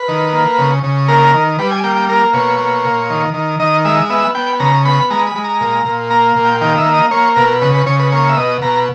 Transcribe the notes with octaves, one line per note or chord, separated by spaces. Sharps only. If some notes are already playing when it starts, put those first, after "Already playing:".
Already playing: B4
D#3
A#3
C#3
C#3
A#3 A#4
D#3
G3 B4
G#5
A#3 G5
G5
A#3 A#4
B2 C#5
A#3
A#2
D#3
D#3
D#3 D#5
G#3 E5
B3 E5
B3 G5
C#3 A#5
B3 B5
G#3 A#5
B5
G#3
A#5
A#2
A#2
A#3 A#5
A#2
G5
D#3 G5
E5
A#3
D#5
A#3 C#5
B2 A#4
C#3 B4
B4
C#3 C#5
B4
A#3 C#5
E5
B2 D#5
B2 A#5